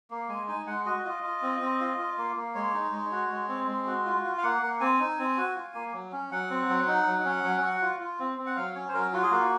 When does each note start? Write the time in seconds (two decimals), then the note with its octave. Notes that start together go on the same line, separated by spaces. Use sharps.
0.10 A#3
0.29 G#3 G#5
0.48 D#4 G#5
0.67 G#3 F#5
0.86 F#4 D#5
1.05 F4 D#5
1.23 F4
1.42 C4
1.60 C4
1.80 F4
1.98 F4
2.18 A#3
2.36 A#3
2.55 G#3 C#5
2.74 D#4
2.93 G#3
3.12 F#4
3.30 G#3
3.48 C4
3.67 G#3
3.87 F#4
4.05 F4
4.24 F4
4.38 F5
4.43 A#3 F#5
4.62 A#3
4.80 C4 G#5
5.00 D#4
5.19 C4
5.37 F#4
5.55 F4
5.74 A#3
5.94 F#3
6.12 C#4
6.31 F#3 F#5
6.50 C4
6.69 F#3
6.87 D#4
7.07 F#3
7.25 C#4
7.44 F#3
7.62 F#4
7.82 F4
8.00 F4
8.20 C4
8.38 C4
8.46 F#5
8.56 F#3 F5
8.75 C#4 C#5
8.89 C5
8.94 F#3 A#4
9.13 F4 F#4
9.23 G#4
9.31 A#3 F#4